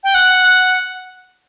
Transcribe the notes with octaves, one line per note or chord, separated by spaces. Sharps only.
G5
F#5